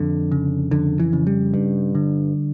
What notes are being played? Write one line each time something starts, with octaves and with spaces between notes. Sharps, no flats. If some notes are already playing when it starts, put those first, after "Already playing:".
Already playing: F2 D3
C#3
F2 D3
E3
C#3
G3
G2
D3